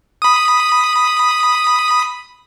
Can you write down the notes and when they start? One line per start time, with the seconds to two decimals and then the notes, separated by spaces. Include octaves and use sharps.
0.22 B5 D#6